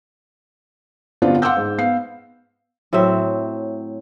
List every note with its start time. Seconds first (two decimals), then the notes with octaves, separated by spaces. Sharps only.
1.22 G2 D3 B3 C4 D4 F4
1.42 F5 F#5 C6 D6 E6 G6
1.57 G#2
1.78 B3 F5 C7
2.93 A2 F#3 C4 E5